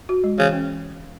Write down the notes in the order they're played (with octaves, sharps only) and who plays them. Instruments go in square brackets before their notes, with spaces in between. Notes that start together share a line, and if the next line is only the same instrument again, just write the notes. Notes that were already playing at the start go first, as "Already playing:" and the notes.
[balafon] F#4
G#3
[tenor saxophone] C#3 [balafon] E3
[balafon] C#4